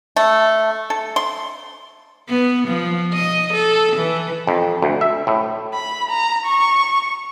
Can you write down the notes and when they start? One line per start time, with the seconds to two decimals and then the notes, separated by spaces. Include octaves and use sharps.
0.16 A3
0.90 A4
1.16 C6
2.29 B3
2.68 F3
3.14 D#5
3.53 A4
3.96 E3
4.47 F2
4.82 D2
5.01 E5
5.27 A2
5.74 B5
6.10 A#5
6.46 C#6